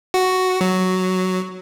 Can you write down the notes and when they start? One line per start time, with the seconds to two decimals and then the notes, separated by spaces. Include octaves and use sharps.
0.14 F#4
0.61 F#3